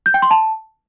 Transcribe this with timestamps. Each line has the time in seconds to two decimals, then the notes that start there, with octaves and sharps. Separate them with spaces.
0.06 G6
0.14 G5
0.22 C6
0.31 A5